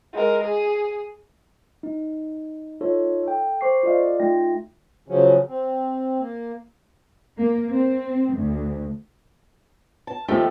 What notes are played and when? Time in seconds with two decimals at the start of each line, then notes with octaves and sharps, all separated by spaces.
0.13 G#3 A#4
0.43 G#4
1.83 D#4
2.81 D#4 F4 A4 C#5
3.24 A4 G5
3.61 C5 C#6 D6 C7
3.83 F4 A4 D5 D#5 F5
4.20 A3 D#4 F4 G5 A#6
5.08 C#3 F3 F#3 C#4
5.48 C4
6.19 A#3
7.36 A#3
7.69 C4
8.34 D2
10.07 A5
10.28 D#2 F3 A3 G4